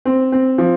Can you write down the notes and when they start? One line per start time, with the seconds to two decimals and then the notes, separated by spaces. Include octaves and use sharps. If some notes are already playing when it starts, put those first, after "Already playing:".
0.05 C4
0.32 C4
0.58 F3